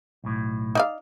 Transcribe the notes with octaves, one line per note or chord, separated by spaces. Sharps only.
B1 A2
D#4 D5 F5